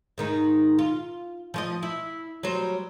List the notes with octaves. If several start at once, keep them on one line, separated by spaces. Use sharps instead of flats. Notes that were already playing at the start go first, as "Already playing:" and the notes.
G#2 D#3 D#4
F4
F3 C#5 D#5
E4
F#3 G3 C5